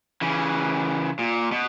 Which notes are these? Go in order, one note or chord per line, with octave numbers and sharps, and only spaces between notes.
C#3 E3
A#2
B2